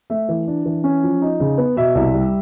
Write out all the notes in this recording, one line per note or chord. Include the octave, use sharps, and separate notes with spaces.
A3 E5
E3
D4
E3
C#4
F3
D#4
C#3
B3
B2 E5
C2
G3